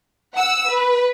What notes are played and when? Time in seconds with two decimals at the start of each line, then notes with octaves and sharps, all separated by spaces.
0.36 F#5 E6
0.69 B4